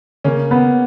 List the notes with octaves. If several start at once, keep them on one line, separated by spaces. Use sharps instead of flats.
C#3 A#3 C#4
B3